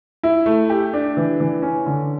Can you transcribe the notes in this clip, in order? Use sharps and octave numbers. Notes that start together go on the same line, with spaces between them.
E4
A3
G4
D4
E3
E3
C#4
D3